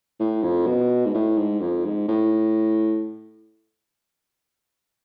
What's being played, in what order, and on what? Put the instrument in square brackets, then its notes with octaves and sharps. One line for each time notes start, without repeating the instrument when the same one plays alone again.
[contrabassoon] A2
F2
B2
G#2
A2
G#2
F2
G#2
A2